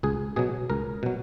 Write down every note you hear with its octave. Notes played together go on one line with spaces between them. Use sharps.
C#2 G#4
B2 F#3 G#4
C#2 A#4
B2 F#3